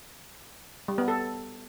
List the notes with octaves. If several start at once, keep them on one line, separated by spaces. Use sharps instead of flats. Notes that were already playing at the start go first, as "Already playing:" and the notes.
G3
B3
A4